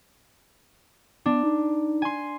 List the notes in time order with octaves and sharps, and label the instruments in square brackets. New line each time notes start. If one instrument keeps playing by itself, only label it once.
[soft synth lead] B3 [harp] D4
[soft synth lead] D#4
[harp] G#5 C6